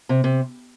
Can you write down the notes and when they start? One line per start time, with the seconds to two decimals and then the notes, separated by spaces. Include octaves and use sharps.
0.09 C3
0.24 C3